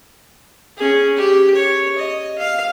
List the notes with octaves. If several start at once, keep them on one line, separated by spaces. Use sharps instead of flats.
C#4 G#4
G4
C#5
D#5
F5